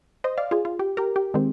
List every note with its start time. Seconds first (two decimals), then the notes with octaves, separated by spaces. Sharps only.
0.24 C5 D#5
0.38 D5 F5
0.51 F4 G#4
0.65 F4
0.79 G4
0.97 G4 A#4
1.16 G4
1.34 D#3 G#3 C4